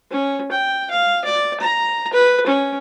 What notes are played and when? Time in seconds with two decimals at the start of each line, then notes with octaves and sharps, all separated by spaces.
0.11 C#4
0.52 G5
0.91 F5
1.25 D5
1.60 A#5
2.13 B4
2.47 C#4